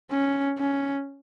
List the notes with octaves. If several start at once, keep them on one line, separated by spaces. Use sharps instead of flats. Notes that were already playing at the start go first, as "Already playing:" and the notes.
C#4
C#4